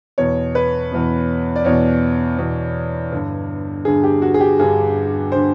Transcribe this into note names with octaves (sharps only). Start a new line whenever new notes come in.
E2 B2 C#5
B4
E2 B2
D5
E2 B2 C#5
E2 B2
G2 D3
G2 D3 G#4
G4
F#4
G#4
G4
G2 D3 G#4
D3 C5